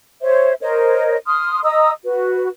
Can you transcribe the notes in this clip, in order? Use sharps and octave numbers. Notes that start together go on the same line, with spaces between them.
C5 C#5 E5
A#4 C5 C#5 D#5
C6 D#6 F6
D#5 A#5 D#6 E6
F#4 B4